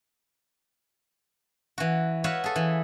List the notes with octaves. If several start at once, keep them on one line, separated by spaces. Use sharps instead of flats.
E3 F#4
F#4 B4 C#5 E5 F5
G#4 A4
E3